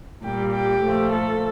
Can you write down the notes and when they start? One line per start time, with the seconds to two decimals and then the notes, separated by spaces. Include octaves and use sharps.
0.24 A#2 G3 G4
0.53 G4
0.83 A#2 F3 A3
1.13 A4